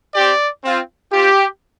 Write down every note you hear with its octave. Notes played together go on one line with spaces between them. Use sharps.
C4 G4 D5
C4 F4
C4 F4 G4